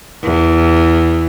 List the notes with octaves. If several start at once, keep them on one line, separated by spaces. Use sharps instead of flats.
E2